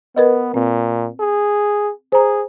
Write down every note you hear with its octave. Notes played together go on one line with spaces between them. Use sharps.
B3 A#4 B4 D#5
A#2 C4
G#4
G#4 C5 A#5